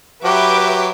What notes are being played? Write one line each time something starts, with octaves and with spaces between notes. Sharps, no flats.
F#3 G4 B4 E5 D6